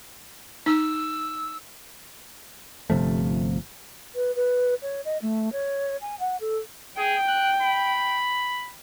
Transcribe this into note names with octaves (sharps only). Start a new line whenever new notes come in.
D#4 E6
G1 C3 F3 A3
B4
B4
C#5
D#5
A3
C#5
G#5
F#5
A4
G#4 G5
F#6
B5